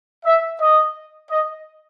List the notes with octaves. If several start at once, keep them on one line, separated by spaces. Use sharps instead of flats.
E5
D#5
D#5